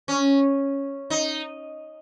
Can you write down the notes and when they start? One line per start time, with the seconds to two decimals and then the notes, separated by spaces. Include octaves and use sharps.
0.08 C#4
1.10 D#4